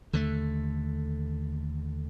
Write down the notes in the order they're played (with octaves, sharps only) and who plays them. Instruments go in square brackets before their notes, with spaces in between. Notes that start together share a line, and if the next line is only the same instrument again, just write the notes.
[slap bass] D#2 D3 F3 A3